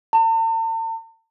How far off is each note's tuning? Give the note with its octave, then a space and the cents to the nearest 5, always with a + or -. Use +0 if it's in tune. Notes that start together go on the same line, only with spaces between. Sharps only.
A5 +45